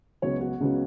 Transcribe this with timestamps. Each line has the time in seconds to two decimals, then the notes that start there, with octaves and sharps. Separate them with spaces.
0.22 C#2 C#3 F#3 B3 C#5
0.41 F#4
0.60 C#2 C#3 F#3 B3